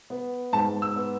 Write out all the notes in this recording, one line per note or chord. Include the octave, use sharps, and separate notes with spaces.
B3
G#2 A5
E6
B3